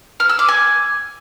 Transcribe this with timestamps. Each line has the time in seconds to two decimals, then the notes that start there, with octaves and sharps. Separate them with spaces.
0.20 F6
0.29 E6
0.39 D6
0.48 G#5